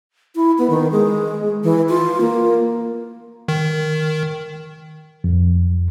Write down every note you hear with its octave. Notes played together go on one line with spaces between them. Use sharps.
E4
B3
D#3
G#3
E3
F4
A#3
D#3
F2